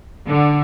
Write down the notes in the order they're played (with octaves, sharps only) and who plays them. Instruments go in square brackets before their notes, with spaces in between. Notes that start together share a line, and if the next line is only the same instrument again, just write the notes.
[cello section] D3